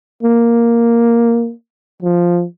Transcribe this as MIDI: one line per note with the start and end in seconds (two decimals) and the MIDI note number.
0.23 1.52 58
2.02 2.45 53